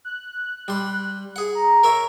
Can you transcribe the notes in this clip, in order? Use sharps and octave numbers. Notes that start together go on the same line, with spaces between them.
F#6
G3 C6
G#4 F#5
A#5
A#4 C#5 E5